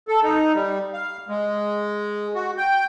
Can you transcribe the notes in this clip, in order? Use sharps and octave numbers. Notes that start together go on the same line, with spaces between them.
A4
D#4
G3
F5
G#3
F#4
G5